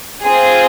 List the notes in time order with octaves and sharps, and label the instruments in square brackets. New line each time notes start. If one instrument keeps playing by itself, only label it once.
[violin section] C4 F4 G#4